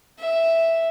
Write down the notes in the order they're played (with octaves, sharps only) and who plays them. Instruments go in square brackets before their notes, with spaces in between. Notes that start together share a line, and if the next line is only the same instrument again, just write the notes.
[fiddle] E5